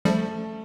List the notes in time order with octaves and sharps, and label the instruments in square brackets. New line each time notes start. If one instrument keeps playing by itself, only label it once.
[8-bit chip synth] F3 G3 [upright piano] A3